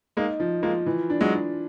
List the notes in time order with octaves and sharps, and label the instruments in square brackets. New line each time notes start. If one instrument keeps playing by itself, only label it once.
[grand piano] G#3 A#3 [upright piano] D#4
[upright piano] F3
[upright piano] F3 [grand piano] G#3 A#3
[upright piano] E3
D4
[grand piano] F#3 G#3
[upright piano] D4